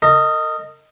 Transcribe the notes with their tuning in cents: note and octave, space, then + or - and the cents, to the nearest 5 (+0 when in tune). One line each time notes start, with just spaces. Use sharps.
A#4 -40 D#5 +0